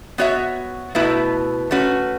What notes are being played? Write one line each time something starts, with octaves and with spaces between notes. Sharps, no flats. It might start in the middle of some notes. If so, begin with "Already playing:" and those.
B3 F#4 C#5 E5
B2 A3 E4 B4
A3 C#4 F#4 B4